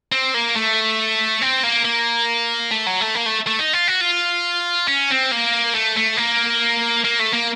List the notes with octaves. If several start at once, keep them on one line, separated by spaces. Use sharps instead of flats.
C4
A#3
A3
C4
A#3
A#3
A3
F#3
A3
A#3
A3
A3
D#4
F4
F#4
F4
C#4
C4
A#3
A3
A3
A#3
A#3
A3
A#3